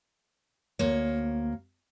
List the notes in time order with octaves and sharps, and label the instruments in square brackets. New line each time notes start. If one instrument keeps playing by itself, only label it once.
[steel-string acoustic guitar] D2 A#3 C#5